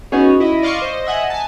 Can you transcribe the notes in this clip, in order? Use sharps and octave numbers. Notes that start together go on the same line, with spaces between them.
B3 C#4 D#4 F#4 G#4 C#5
E4 D#5
D5 D#5 F5 C6 C#6
C5 D#5
D#5 E5 F#5 G#5
G#5 A5